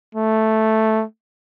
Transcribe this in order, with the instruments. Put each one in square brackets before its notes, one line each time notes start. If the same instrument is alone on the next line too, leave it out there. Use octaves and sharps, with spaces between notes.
[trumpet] A3